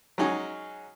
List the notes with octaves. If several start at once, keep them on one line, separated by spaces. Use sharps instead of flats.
F#3 G#3 C#4 D#4 G#4